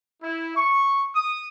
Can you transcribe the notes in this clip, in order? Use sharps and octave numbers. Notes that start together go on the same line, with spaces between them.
E4
C#6
D#6